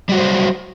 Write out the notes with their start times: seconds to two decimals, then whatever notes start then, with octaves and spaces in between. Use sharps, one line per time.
0.09 G3
0.12 F#4
0.14 F#3
0.17 C5